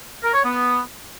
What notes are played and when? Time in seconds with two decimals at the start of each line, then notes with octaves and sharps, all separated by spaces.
0.24 A#4
0.34 C#5
0.44 B3